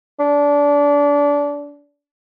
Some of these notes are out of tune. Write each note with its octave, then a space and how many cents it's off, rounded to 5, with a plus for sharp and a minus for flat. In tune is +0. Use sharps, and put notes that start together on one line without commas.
D4 -25